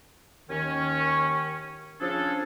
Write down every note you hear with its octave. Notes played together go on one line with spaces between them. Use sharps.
D#2 D#3 C#4
C#3 F3 C#4 D4 G#4 A4